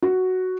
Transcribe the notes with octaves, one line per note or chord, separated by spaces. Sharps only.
F#4